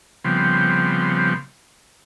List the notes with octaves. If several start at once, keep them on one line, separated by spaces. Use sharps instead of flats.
C#3 F3 G3 B3 C4